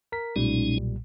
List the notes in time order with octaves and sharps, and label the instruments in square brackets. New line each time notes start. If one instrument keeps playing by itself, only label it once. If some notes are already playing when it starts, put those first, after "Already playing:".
[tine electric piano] A#4 B6
[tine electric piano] B1 A#2 G3 [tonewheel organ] G#3 C#4 D#4